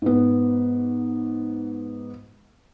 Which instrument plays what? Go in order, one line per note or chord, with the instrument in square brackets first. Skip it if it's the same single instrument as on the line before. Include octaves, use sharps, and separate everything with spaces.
[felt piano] G#2 B3